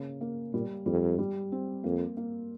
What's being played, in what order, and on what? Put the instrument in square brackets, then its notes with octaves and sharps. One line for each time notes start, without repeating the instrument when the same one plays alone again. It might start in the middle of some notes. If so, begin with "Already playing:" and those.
Already playing: [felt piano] C#3 A#3
A#3
[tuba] A#2 [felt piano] G3
[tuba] F2 [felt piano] G3
[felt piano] G3
C4
[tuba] F2 [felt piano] A#3
[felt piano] A#3